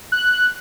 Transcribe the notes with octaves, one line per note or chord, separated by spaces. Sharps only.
F#6